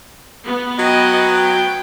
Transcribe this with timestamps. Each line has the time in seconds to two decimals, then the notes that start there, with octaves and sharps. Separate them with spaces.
0.46 B3
0.79 F#3 D#5 G5
1.36 G5